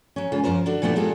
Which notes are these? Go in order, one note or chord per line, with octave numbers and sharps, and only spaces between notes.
F#3 C#4
C#3 G#3 F4
F#2 F3 F4 A#4 C5
D3 D4 F#4
A#2 G3 A3 B3 D4 E4
G3 G#3 A#3 D4 F4 A4